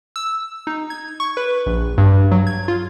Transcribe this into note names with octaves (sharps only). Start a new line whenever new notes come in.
E6
D#4
G#6
C#6
B4
A#1
G2
F#3
G#6
F4